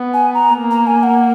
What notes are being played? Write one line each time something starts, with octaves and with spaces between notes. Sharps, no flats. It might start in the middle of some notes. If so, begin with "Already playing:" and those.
Already playing: B3
G#5
A#5
A#3
A#5
G#5
F#5